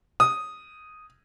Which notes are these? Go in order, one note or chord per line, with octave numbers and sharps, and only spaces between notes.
D#6